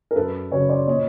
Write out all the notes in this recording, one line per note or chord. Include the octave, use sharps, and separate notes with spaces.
A#4
F#2 A4 B4
C#3 F#3 B4 C#5
C5 D5
A#2 C#5 D#5